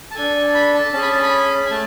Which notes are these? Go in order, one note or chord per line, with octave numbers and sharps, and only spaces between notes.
A5
D4 A4 G#5
B5
A5
C#4 G#4 A5
B5
A5
B5
G#5
A3 A5